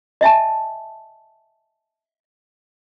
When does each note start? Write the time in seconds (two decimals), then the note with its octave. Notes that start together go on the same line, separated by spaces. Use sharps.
0.21 D#5 E5 G#5 A5